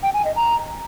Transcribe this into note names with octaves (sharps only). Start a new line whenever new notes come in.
G5
G#5
D#5
A#5